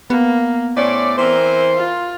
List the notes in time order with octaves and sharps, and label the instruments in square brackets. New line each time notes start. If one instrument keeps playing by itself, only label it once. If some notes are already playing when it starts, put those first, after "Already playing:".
[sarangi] A#3 [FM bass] B3
[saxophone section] A2 C#4 D5 [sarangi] C5
[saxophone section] E3 C4 C5 [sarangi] A#4
[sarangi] F4